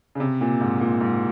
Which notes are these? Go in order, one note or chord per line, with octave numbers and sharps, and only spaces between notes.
C#3
C3
A#2
G#2
A#2
G#2